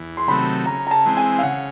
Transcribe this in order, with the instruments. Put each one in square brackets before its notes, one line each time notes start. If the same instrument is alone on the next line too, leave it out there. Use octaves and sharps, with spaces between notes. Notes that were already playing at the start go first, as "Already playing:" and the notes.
Already playing: [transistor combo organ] E2
[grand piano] C6
[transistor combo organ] C3 D#3 F#3 A3 [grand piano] B5
[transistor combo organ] C#3 [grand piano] A#5
[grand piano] A#5
A5
[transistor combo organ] E3 G#3 C4
[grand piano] G#5
F5
[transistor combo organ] C#3 [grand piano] F#5